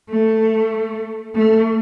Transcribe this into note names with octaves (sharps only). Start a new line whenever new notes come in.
A3
A3